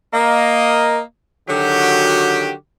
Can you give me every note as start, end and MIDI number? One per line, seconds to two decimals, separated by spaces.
0.14 1.00 58
0.14 1.00 75
1.49 2.53 50
1.49 2.53 51
1.49 2.53 54
1.49 2.53 66
1.49 2.53 67